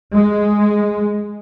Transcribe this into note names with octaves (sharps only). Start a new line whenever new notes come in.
G#3